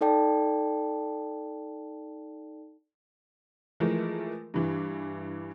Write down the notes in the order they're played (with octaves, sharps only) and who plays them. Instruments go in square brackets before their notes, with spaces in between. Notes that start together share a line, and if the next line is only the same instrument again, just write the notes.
[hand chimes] D#4 A4 D5 G5 A5
[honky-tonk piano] E3 F3 G#3 A3 A#4
G2 E3